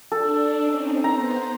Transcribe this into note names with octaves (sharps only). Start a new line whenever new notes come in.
D4 A4
C4 C#4 D#4
B3 C5 A#5